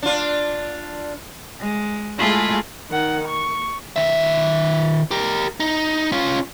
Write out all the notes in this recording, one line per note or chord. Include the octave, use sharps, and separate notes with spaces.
D4 F4
G#3
G#3 A3 E4 F4 G#4
D#3 F#5
C#6
D#3 E5
G4 A#4
D#4
C#4 F4